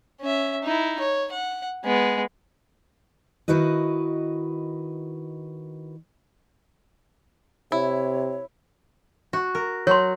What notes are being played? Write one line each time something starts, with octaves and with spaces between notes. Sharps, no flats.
C#4 E5
D#4 E4
C#5
F#5
G#3 B3
D#3 E4 F#4 B4 D#5
C3 E4 C#5
F#4
A#4
F#3 C#5 C6